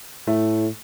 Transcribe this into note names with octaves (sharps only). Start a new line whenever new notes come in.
A2 A3